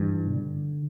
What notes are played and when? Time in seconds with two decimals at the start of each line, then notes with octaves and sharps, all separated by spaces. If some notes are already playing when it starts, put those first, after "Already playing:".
Already playing: G2 E3
0.28 B2
0.37 D3